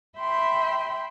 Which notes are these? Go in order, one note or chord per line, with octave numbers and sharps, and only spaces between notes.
E5 G5 B5 C6